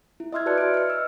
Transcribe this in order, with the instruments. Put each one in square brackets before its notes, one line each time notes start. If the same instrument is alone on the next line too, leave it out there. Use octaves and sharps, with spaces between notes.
[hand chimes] E4
D#5 E5 C6 E6 F6 G#6
F#4 B4 D5 A5 F#6 C#7
D#5 D7
F6 C#7
E6